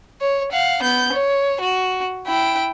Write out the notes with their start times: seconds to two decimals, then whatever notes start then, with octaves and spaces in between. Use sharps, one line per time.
0.21 C#5
0.52 F5 F#5
0.83 B3 G6
1.13 C#5
1.60 F#4
2.27 E4 G5